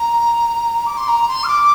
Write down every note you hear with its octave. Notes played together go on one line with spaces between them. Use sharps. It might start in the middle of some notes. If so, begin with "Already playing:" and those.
Already playing: A#5
D6
C6
A#5
C6
F6
D6